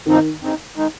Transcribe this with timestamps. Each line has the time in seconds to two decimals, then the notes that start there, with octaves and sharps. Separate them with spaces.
0.06 G2 D#3 F3 C4 D#4
0.40 G2 D#3 G#3 C4 D#4
0.76 D#3 G#3 D#4